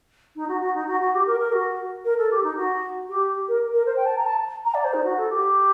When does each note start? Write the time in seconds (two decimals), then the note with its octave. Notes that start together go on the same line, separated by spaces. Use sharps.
0.36 D#4
0.49 F#4
0.61 F#4
0.74 D#4
0.87 F#4
1.01 F#4
1.14 G4
1.27 A#4
1.40 A#4
1.52 F#4
2.05 A#4
2.18 A4
2.31 G4
2.43 D#4
2.57 F#4
3.09 G4
3.48 A#4
3.73 A#4
3.86 C5
3.97 G5
4.06 A5
4.17 A#5
4.26 A5
4.65 A#5
4.74 D5
4.84 C5
4.94 D#4
5.04 F#4
5.17 A4
5.30 G4